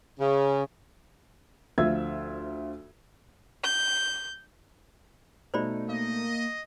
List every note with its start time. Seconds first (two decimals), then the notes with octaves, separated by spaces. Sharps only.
0.19 C#3
1.78 D2 F3 F4 E5 E6 G#6
3.63 G6
5.54 B2 A3 D#4 C5 D5 B5
5.88 A#3 D#5